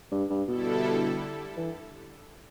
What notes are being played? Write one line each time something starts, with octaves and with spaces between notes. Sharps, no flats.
G2
G2
B2 D3 G3 E4 A4
E3